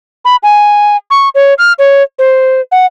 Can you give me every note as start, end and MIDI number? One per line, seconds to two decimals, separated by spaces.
0.25 0.36 83
0.43 0.97 80
1.10 1.29 85
1.35 1.54 73
1.58 1.73 89
1.79 2.03 73
2.19 2.61 72
2.72 2.86 78